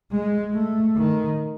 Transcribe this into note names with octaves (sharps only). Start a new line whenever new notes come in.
G#3
A3
D#3